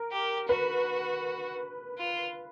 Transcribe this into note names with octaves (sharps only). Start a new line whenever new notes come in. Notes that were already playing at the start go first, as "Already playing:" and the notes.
Already playing: A#4
G4
F#4 B4
F4